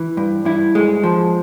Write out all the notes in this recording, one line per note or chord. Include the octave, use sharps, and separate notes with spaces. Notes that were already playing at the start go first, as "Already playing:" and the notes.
Already playing: E3
G2
G2 E4
G#3
F3